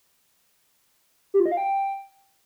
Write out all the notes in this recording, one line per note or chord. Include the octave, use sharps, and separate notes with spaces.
G4
F4
D#5
F5
G5